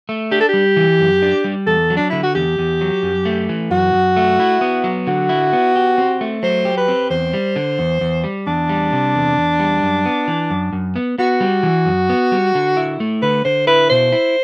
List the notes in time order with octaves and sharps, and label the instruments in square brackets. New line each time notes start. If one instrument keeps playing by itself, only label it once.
[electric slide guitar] A3
[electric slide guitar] D4 [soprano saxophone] G4
[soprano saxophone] A4
[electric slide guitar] G3 [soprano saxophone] G4
[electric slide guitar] E3
F#2
D4
G3
[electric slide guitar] E2 [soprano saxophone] A4
[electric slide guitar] F#3
[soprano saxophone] D4
[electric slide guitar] D3 [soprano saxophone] E4
[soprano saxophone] F#4
[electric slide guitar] E2 [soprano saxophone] G4
[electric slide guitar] E2
F#3
F#2
A3
E3
[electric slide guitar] F#2 [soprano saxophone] F#4
[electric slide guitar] F#2
A3
E4
B3
F#3
[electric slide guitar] D3 [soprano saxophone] F#4
[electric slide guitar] E4
B3
G4
C4
A3
[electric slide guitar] F#3 [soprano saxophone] C5
[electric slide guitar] G4
[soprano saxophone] B4
[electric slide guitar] C4
[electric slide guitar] E2 [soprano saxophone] C5
[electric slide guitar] G3
D3
E2
E2
G3
[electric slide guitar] E2 [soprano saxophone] D4
[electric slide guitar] G3
C3
E2
E2
G3
F#2
B3
E3
F#2
F#2
B3
[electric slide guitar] B3 [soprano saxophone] F#4
[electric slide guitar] G3
E3
F#2
B3
G3
D3
E4
A3
[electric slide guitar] D3 [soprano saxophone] B4
[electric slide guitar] D3 [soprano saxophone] C5
[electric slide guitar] E4 [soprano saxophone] B4
[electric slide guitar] B2 [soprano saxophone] C5
[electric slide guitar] E4